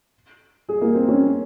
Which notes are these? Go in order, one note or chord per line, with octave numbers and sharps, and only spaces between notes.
G#4
A#3
C4
C#4